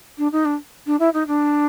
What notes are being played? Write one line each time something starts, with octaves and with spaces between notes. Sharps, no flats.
D4
D#4
D4
D4
E4
D#4
D4